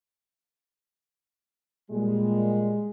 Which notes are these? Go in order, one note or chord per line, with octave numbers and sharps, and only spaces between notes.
A#2 G3 G#3